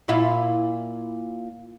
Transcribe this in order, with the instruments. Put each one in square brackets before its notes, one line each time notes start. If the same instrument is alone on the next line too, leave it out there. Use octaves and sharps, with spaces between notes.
[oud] A#2 E4 F4